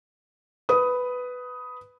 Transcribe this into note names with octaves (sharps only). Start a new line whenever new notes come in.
B4 D#6